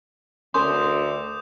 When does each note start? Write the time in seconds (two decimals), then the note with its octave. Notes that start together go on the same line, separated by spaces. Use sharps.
0.54 D2 C#4 A#4 C6 D6 D#6 G6